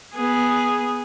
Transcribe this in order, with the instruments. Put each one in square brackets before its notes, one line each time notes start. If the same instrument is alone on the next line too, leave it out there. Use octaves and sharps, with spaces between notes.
[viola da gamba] B3 G#4